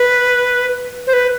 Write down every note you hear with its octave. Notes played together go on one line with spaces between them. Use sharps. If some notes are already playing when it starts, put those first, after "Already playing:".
Already playing: B4
C5
B4